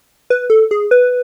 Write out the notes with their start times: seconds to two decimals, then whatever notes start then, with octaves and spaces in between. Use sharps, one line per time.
0.30 B4
0.50 A4
0.71 G#4
0.91 B4